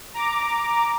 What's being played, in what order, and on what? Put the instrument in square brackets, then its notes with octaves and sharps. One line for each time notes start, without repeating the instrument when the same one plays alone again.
[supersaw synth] A#5 D6